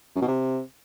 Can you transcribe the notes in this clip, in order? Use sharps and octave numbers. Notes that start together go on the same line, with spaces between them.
F#2
B2
C3